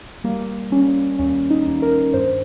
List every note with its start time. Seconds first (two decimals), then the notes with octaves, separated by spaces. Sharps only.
0.24 G3 A#3
0.71 G3 C#4
1.19 D#2 C#4
1.50 D#4
1.66 D#2
1.82 A#4
2.13 G2 C5